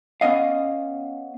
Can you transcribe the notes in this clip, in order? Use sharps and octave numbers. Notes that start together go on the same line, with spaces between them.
B3 C#4 D#5 F5